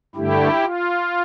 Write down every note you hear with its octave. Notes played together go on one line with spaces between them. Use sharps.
G2 D3 A3 E4 G4
F4